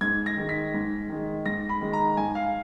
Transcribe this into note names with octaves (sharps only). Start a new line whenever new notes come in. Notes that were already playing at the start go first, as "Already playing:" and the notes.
G#2 G#6
A#6
D#3 G#3
B6
G#2
D#3 G#3
G#2 A#6
B5
D#3 G#3
A#5
G#2 G#5
F5